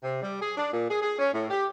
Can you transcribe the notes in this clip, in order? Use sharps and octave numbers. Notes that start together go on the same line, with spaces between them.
C3
G3
G#4
D4
A#2
G#4
G#4
C#4
A2
G4